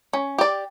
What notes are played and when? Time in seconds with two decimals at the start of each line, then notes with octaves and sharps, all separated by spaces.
0.13 C#4
0.38 G4 D5